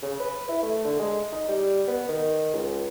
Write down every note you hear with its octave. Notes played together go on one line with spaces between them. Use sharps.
C#3
B4
E4
A3
D3
G#3
D#4
G3
B3
D#3
C#2